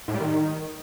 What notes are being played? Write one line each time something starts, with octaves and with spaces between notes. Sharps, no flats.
A2
G3
D#3